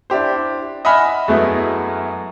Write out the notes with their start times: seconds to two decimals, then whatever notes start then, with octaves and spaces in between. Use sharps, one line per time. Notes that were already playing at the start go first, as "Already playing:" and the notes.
0.10 D4 E4 G4 C5
0.85 D#5 E5 F#5 G#5 B5 F6
1.28 F#2 F#3 G#3 A3 B3 E4